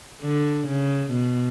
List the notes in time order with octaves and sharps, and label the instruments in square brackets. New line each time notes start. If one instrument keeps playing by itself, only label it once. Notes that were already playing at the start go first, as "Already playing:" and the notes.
[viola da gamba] D3
C#3
B2